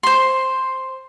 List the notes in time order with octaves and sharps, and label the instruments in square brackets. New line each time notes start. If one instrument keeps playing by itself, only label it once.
[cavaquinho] C5 C6